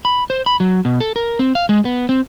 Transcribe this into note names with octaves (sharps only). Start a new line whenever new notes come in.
B5
C5
B5
F#3
B2
A4
A#4
C4
F5
G#3
B3
C4